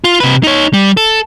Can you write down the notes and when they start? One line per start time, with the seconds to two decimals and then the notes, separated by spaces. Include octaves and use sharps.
0.04 F4
0.20 C3 B4
0.43 D#4 C#5
0.73 G3
0.97 A4